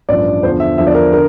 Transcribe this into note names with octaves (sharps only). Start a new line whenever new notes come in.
A1 G2 F3 D5
E2 D3 F3 C5
E5
E2 D3 F3 E5
D5
A#4
D3 A#4